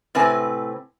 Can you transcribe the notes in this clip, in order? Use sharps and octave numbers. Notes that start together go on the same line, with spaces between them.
A2 C3 C4 B4 G#5